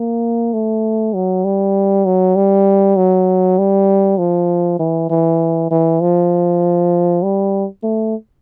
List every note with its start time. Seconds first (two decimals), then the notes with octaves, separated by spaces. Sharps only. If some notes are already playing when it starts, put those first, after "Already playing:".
Already playing: A#3
0.53 A3
1.15 F#3
1.45 G3
2.06 F#3
2.36 G3
2.97 F#3
3.58 G3
4.18 F3
4.79 E3
5.10 E3
5.71 E3
6.01 F3
7.23 G3
7.83 A3